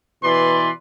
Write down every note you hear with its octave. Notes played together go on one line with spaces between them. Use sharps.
B2 E3 B4 D5 C6